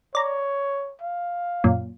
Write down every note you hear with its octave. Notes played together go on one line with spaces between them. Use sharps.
C#5 D5 A#5
F5
F#2 A#2